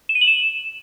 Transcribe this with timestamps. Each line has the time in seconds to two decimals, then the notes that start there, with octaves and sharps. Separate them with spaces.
0.09 E7
0.15 D#7
0.21 F#7
0.27 E7